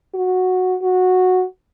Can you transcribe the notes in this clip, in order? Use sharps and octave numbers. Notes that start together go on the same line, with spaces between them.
F#4
F#4